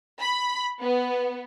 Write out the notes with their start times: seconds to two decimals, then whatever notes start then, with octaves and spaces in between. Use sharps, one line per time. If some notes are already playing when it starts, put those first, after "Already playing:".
0.22 B5
0.82 B3